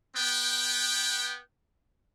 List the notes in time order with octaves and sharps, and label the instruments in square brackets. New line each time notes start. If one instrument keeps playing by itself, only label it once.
[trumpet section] B3 G5